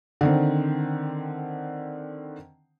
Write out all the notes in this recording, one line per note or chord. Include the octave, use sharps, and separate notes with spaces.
D3 D#3 C4